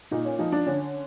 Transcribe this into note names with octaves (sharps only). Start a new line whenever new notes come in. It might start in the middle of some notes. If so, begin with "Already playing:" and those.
A#2 D#4
C#4
F3 D#4
D4
D3 C#4